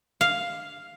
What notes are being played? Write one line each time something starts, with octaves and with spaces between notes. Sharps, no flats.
F5